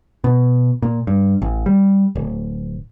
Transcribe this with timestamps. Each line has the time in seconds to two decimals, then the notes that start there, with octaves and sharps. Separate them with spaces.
0.24 B2
0.82 A#2
1.07 G2
1.42 A1
1.66 G3
2.15 D1